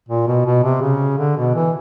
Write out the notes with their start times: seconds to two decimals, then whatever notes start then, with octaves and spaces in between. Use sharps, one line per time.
0.09 A#2
0.27 B2
0.46 B2
0.64 C3
0.82 C#3
1.18 D3
1.37 B2
1.55 E3